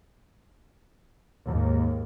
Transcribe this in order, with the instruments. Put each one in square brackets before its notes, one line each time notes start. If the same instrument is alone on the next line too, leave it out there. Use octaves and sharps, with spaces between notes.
[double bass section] D#2 G#2